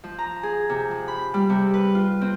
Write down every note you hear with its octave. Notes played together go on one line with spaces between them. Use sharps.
F3
A#5
G#4
C3
F3
B5
G3
C3
B4
F4
C4